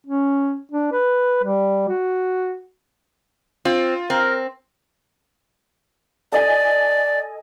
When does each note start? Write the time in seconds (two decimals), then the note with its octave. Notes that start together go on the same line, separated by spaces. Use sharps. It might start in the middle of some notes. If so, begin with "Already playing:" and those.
0.07 C#4
0.72 D4
0.93 B4
1.43 G3
1.89 F#4
3.65 C4 F4
4.10 C4 A#4
6.32 A4 D5 D#5 G#5